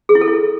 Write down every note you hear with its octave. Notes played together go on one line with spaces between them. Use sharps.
G#4
E4
A4
E4